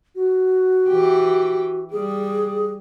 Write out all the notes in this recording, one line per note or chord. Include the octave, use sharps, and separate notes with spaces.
F#4
E3 G4
G3 G#4